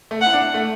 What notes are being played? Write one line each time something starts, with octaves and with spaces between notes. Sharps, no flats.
A3
F#5
E4
D4
A3